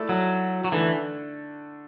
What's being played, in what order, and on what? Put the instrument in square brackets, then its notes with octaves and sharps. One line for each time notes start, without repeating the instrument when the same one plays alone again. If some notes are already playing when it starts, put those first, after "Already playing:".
Already playing: [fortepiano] A3 E4 A4 D5
[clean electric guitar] F#3
F#3
[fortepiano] D3 A3 D4 A4 [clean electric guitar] E3